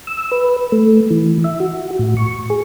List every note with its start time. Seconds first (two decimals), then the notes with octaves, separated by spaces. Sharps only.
0.07 E6
0.31 B4
0.72 A3
1.11 E3
1.44 E5
1.60 F#4
1.99 A2
2.17 C#6
2.50 G#4